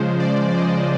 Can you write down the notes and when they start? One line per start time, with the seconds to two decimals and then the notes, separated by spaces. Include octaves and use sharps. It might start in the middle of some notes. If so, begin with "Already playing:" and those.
Already playing: C#3 F3 G#3 C5
0.20 D5
0.51 D5
0.58 D#5